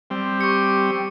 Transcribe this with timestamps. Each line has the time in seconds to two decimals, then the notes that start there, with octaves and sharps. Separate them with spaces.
0.10 G3 C4
0.41 G4 C#6 C#7